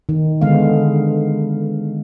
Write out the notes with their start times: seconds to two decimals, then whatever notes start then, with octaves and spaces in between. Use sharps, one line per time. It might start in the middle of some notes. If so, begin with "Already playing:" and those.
0.09 D#3
0.41 D3 G#3 B3 F5